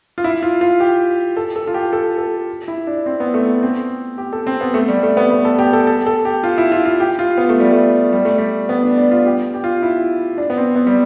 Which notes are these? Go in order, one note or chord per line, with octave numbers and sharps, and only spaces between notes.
F4
E4
F4
F4
G4
A4
A4
F4
G4
A4
A4
E4
D4
C4
B3
A3
C4
G4
A4
C4
B3
A3
G3
A3
B3
B3
A4
G4
A4
A4
A4
G4
F4
E4
F4
F4
G4
F4
B3
A3
G3
A3
G3
A3
G3
B3
D4
D4
F4
G4
G4
F4
E4
D4
B3
C4
B3
G3